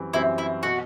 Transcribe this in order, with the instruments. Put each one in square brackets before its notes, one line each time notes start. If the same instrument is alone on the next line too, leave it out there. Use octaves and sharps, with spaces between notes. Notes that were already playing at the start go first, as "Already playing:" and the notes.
Already playing: [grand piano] F#2 E3 G3 C4
[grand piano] F#2 E3 G3 C4 [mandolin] E4
[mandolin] E4
[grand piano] B2 [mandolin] F#4